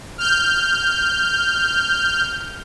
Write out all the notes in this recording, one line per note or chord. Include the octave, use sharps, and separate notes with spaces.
F6 G6